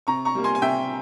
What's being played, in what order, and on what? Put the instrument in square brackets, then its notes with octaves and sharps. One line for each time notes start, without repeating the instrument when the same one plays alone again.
[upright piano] C3 A#5 C#6
A#5 C#6
G3 A#3
G#5 C6
G#5
C3 E5 G5